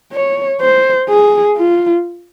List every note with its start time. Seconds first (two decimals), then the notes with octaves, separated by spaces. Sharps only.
0.12 C#5
0.60 C5
1.09 G#4
1.56 F4